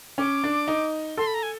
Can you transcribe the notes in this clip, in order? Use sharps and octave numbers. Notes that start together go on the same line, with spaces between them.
C#4 D6
D4
D#4
A4 C6
B5
A#5
G#5